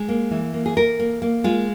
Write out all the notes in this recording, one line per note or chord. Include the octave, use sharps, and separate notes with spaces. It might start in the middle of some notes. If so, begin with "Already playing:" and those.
Already playing: G#3
A#3
E3
A#3
G#4
A#3 A#4
A#3
A#3
G#3 F4